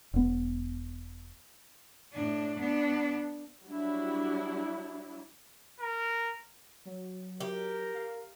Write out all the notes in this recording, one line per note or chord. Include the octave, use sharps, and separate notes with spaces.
E1 B3
A2 D4
B3 D4
F#3 G3 D4 E4
A#4
F#3
G4 A#4
F5